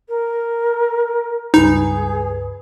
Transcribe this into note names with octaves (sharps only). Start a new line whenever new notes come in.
A#4
C#2 G2 D#4 G#4 B4